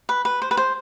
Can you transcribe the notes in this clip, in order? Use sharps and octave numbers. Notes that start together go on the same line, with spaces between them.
B4
B4
C5
B4
C5